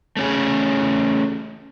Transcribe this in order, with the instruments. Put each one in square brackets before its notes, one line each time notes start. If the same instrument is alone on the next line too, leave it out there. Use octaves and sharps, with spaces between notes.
[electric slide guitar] A3 C#4 G#4